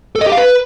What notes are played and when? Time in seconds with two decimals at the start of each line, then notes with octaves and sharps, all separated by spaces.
0.15 A4
0.21 D#5
0.26 G4
0.32 F5
0.37 B4